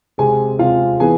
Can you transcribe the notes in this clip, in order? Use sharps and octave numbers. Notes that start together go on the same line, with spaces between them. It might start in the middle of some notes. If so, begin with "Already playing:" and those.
C3 G#3 C4 G#4 G#5
C3 G#3 C4 F4 F5
E3 B3 G#4 G#5